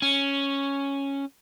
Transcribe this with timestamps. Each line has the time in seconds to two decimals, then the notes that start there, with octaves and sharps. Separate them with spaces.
0.02 C#4